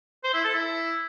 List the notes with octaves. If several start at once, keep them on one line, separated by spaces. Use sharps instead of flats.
C5
E4
A4
E4